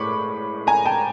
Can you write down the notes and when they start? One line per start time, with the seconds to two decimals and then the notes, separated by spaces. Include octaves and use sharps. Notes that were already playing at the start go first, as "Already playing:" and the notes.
Already playing: A2 G#3 B5 C#6 D6
0.67 G#5 A#5
0.85 G5 A5